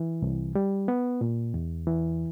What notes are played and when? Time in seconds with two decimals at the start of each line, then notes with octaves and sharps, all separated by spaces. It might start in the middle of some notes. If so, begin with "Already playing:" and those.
Already playing: E3
0.22 C2
0.55 G3
0.88 B3
1.21 A#2
1.54 E2
1.87 E3